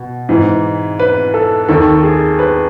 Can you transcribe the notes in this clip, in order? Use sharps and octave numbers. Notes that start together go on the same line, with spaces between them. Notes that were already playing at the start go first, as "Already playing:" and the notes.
Already playing: B2
G#2 E3
B4
A4
D#2 D#3 A4
G#4
B4